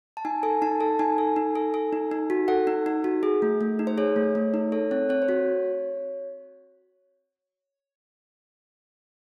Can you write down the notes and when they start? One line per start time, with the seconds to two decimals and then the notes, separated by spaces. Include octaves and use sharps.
0.17 A5
0.25 D#4 G#5
0.43 A4 G#5
0.62 D#4 A5
0.80 A4 A5
0.99 D#4 G#5
1.18 A4
1.36 D#4
1.56 A4
1.74 A4
1.93 D#4
2.11 D#4
2.30 F#4
2.48 A4 F#5
2.67 D#4
2.86 D#4
3.04 F#4
3.23 G#4
3.42 A3
3.61 A3
3.79 D#4
3.87 C5
3.98 G#4 C#5
4.16 A3
4.35 A3
4.54 D#4
4.72 A4 C#5
4.91 C4 C#5
5.09 C4 C#5
5.22 C5
5.28 F#4 C#5